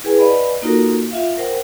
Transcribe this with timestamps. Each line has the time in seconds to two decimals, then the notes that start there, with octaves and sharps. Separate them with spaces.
0.04 E4 G#4 B4 G5 G#5
0.19 B4 D5 D#5 F5 G#5 B5
0.62 A#3 D#4 F4 F#4 A4 A#4
1.11 F4 E5 F5
1.37 A#4 C5 F#5 G5